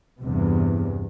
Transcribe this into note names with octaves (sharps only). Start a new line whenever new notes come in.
E2 G2 C3